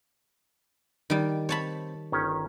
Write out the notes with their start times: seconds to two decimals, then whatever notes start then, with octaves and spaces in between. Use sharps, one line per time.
1.10 D#3 G3
1.49 C4 C#5 A5 B5
2.12 G1 D#3 C#4